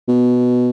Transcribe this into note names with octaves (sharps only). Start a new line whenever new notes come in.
B2